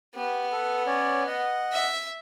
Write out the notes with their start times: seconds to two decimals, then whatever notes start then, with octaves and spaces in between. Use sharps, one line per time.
0.15 B3 G4
0.52 A4 B4
0.87 C#4 C#5 D5
1.27 D#5 F#5
1.72 E5